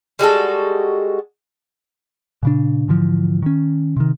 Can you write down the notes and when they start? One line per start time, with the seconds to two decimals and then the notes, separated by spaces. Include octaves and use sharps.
0.19 G3 G#3 F#4 A4
2.43 A#2 C#3 D4
2.88 G#2 D3 E3 F3
3.42 D#3 C#4
3.97 C3 D#3